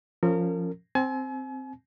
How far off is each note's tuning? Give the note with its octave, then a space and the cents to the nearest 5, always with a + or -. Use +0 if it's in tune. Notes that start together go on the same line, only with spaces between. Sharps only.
F3 +0 C#4 +0 A#4 -35
C4 +0 G#5 +40